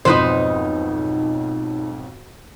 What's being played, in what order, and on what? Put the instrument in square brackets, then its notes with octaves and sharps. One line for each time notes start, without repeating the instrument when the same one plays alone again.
[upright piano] B1 F2 G#2 [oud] D#4 B4 C5